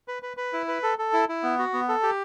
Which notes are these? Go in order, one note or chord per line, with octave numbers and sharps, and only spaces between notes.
B4
B4
B4
E4
B4
A4
A4
E4
E4
B3
F#4
B3
A4
G4